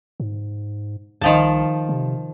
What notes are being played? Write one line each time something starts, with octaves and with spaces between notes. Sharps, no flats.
G#2
C2 D#3 F3 A5
C3